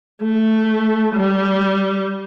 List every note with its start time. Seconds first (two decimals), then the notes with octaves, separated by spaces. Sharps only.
0.23 A3
1.15 G3